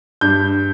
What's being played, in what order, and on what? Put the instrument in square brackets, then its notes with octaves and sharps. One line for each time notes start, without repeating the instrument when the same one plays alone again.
[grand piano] G2 G6